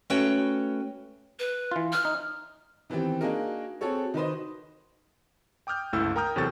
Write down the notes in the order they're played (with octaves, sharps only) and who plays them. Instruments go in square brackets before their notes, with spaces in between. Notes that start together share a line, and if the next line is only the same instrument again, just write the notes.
[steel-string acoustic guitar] A3 C#4 F#4 B4 C#5 G5
[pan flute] B4
[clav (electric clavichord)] E3 F4
[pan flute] F6
[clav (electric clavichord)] D#4
[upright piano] D#3 E3 B3 C4 G4
A#3 D4 D#4 F#4 G#4 A#4
C4 F#4 G#4 A4 C#5
D#3 D#4 F#4 B4 C5 D#5
[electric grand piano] G5 D6 D#6 F6 G6
G1 C#2 A3 E4 A4 E6
A#4 G5 A#5 D#6 F6 G6
E2 C3 F#3 A4 C#6 A6